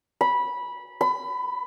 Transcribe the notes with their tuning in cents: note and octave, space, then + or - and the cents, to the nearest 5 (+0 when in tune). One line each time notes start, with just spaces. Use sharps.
B5 -15
B5 +25